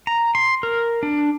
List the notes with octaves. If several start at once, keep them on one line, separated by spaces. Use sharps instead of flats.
A#5
C6
A#4
D4